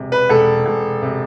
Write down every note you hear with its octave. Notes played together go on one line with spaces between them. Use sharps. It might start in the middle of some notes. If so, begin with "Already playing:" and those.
Already playing: E1 C3
B4
E1 A4
E1
C3